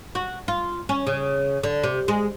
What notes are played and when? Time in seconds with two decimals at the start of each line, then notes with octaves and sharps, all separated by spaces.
0.15 F#4
0.48 F4
0.89 C#4
1.07 C#3
1.63 D3
1.83 C3
2.08 G#3